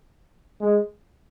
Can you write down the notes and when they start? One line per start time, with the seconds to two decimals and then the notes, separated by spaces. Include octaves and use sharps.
0.60 G#3